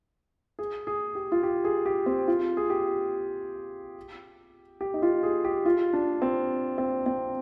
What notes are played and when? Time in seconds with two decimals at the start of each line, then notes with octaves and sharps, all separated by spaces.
0.59 G#4
0.87 G#4
1.15 G4
1.32 F4
1.43 G4
1.65 G#4
1.86 G4
2.06 C4
2.28 F4
2.57 G#4
2.70 G4
4.81 G4
4.94 D#4
5.02 F4
5.23 G#4
5.44 G4
5.66 F4
5.93 D4
6.22 C4
6.78 C4
7.06 C4